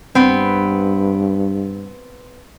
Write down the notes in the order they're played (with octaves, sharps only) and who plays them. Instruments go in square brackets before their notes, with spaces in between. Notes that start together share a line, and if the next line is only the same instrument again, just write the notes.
[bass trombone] G2 [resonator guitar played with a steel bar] B3 C4